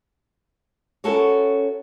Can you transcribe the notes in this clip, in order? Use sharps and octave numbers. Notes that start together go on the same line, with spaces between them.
C#4 E4 F#4 A4 A#4 C#5